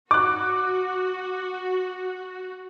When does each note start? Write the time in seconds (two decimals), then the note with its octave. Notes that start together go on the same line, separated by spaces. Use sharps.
0.11 F#4 D6 F#6